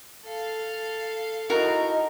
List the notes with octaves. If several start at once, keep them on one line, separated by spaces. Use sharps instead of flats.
A4 F5
D#4 E4 F#4 A#4 D#5 A#5